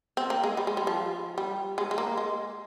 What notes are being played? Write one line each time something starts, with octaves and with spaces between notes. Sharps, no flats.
C4
A#3
G#3
G3
G#3
G3
F3
G3
G#3
G#3
A#3
G#3